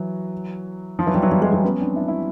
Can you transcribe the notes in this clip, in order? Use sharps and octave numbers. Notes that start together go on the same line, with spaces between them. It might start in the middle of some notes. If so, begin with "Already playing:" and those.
Already playing: E3 F#3
F3
E3 F#3
F3 G3
E3 F#3
F3 G3
F#3 G#3
F#3 G#3
B3 C#4
C4 D4
D4 E4
D4 E4